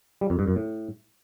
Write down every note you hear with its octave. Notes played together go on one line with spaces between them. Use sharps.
G3
F2
G2
F#2
A2